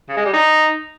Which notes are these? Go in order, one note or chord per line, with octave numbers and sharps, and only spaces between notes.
C#3
G#3
G3
D#4